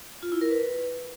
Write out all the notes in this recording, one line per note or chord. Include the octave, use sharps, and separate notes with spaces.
F4
E4
A#4
B4